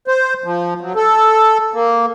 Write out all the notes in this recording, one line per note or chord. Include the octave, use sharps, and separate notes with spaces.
C5
F3
F#3
A4
A#3